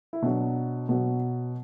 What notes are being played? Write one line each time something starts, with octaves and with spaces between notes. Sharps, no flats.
E4
B2 F#3 D4
B2 F#3